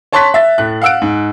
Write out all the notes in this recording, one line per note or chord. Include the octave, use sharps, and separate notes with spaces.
C#5 A5 C6 C#6 F#6 B6
E5 A6
A2 F#6
F5 F#5 E6 F#6 D7
G#2